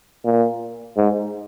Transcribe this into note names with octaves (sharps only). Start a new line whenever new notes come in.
A#2
G#2